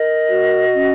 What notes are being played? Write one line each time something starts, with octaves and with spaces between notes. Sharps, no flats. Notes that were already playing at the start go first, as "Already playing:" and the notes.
Already playing: A#4 D#5
F#4
C#4